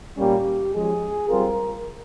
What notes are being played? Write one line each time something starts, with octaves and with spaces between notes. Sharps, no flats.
A#2 G3 A#3 C#4 G4
F3 G#3 C#4 G#4
G3 C4 F4 A#4